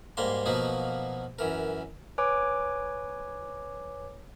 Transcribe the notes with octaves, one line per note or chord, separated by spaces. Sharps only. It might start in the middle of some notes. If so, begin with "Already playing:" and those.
G#2 G3 A#3 C6
B2 F3 F#3 A#3 D#4
F#2 E3 A#4
B4 C#5 G#5 D6